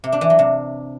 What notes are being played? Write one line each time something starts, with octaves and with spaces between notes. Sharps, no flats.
C3
D4
E3
F#3
C3